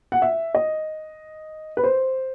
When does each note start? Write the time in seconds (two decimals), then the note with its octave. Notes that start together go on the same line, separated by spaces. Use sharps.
0.12 F#5
0.22 E5
0.55 D#5
1.77 B4
1.84 C5